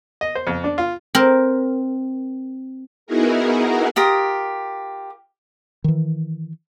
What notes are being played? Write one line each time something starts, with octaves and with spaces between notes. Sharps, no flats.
D#5
C5
F2
D4
F4
C4 A#4
B3 D#4 E4 F#4 G#4 A#4
F4 G4 A#4 D#6
D#3 E3